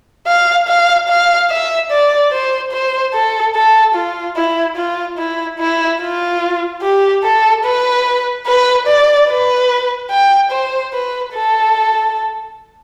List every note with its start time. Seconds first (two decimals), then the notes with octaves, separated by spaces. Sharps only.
0.27 F5
0.68 F5
1.09 F5
1.50 E5
1.91 D5
2.32 C5
2.72 C5
3.14 A4
3.55 A4
3.95 F4
4.37 E4
4.77 F4
5.18 E4
5.59 E4
6.01 F4
6.82 G4
7.25 A4
7.65 B4
8.47 B4
8.87 D5
9.29 B4
10.11 G5
10.52 C5
10.93 B4
11.34 A4